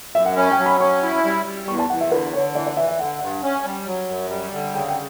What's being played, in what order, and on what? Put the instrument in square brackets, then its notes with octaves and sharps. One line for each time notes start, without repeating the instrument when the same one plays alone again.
[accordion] F#2 [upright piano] E5
[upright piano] F#5
[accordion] C#4 [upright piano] B5
[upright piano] G5
[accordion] F#3
[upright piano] B5
[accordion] C#4 [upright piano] C#6
[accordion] E4
G3
G3
[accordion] E2 [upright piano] C#6
[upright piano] A5
[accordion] E2 [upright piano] F#5
[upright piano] E5
[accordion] D3 [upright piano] B4
[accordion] D3 [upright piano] C#5
[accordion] E3 [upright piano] D5
[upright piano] D5
[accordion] E3 [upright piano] E5
[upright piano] E5
[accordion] D3 [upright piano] F#5
[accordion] G2
C#4
G3
F#3
F#2
G3
D3
[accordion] C#3 [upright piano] G5
[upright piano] G5